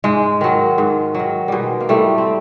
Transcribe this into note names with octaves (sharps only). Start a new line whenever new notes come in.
G#2 G#3
D#3 F#3
G#2
D#3 F#3
B2 G3 G#3
A#3
A2 G3 A3
C4